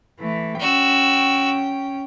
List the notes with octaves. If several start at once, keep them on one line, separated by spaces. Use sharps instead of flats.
E3 A3
C#4 F#4 G5 E6